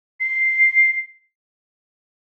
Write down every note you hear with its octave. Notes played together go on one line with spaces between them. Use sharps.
C7